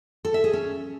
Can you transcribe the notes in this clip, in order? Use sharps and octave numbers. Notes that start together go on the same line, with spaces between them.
A4
E5
G#4
C#4